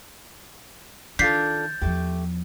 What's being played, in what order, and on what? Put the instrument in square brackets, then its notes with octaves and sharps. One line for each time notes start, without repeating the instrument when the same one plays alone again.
[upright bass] D#3 [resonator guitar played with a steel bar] D4 F4 A4 [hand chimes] G6 A6 [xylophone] B6 C7
[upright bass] E2 F3 [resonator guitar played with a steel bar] A3 G4